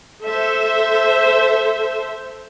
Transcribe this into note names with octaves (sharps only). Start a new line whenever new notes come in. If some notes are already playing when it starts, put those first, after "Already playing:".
A4 C5 E5